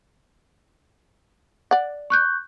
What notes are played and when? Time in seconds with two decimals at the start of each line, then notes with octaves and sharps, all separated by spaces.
1.71 D5 F#5
2.10 C#6 F#6 G6